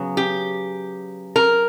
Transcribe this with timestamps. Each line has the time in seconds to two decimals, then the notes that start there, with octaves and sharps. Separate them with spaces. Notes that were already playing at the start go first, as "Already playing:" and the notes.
Already playing: C#3 F#3 B3
0.17 G4
1.36 A#4